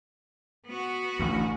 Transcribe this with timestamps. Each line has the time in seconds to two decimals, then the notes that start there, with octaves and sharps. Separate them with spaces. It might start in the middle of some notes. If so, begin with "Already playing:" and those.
0.67 B3 F#4
1.19 A1 D2